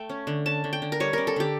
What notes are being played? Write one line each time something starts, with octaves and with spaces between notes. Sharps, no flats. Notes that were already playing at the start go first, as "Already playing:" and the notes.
Already playing: A3 G5
C#4
D3
C#4 A5
D3
G5
D3
A#4
G3 C#5
C#4 A#4
A4
D3 G4